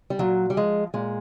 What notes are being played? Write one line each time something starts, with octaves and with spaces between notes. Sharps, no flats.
G3
A#2 F#3
G3
F3 G#3
A#2 G#3